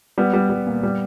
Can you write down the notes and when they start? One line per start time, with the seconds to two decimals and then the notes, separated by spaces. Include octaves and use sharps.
0.18 G3 B3
0.33 G3
0.50 G3
0.67 A#2
0.83 G3